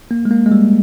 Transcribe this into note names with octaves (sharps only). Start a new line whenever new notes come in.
A#3
G#3
A#3
G#3
G3